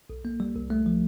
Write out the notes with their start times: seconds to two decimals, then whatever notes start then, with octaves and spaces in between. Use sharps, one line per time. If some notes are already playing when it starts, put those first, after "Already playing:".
0.10 B1
0.25 A#3
0.40 G3
0.56 C2
0.70 A3
0.86 F3